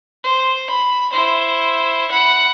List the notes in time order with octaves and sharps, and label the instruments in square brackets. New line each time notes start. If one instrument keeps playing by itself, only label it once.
[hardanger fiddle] C5
B5
E4 C5
F#5 B5